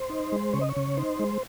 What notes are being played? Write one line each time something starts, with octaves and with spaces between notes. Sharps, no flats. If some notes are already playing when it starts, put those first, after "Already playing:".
Already playing: C5
D#4
G#3
C#3 C#5
D#5
C#5
C#3
D#4 C5
G#3